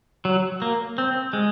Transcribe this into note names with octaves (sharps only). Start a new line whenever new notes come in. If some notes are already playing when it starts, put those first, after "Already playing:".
F#3
A#3
C4
G#3